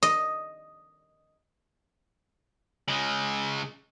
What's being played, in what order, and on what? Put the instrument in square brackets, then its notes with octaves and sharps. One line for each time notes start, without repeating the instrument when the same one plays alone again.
[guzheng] D#5
[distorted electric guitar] C#3 G#3